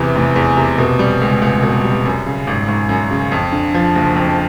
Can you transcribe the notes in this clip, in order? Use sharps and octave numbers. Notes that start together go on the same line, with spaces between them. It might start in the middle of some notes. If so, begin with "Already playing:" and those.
Already playing: E2 C3 E3
F1
E2
C3
B2
G3
C#2
C#2
B2
G3
F#2
C#3
G#1
G#1
F#2
C#3
F2
D3
F3
F#1
F2